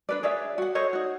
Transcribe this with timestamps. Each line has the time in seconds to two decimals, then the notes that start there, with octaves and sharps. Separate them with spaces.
0.09 D4 B4 D5
0.23 G#4 C#5 D5 E5
0.58 F#4 F#5
0.75 A4 C5 C#5 D#5
0.93 D#4 F#4